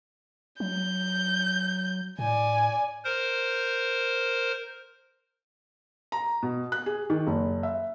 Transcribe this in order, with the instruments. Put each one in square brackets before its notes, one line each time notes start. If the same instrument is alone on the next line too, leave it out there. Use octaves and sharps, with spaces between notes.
[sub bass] F#3 [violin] G6
[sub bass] A2 [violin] D5 G#5
[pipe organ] A#4 C5
[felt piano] A#5
B2
F#6
G#4
D#3
F#1
E5